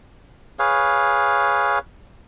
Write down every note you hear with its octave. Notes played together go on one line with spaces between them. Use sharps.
G#4 B4 C#5 F5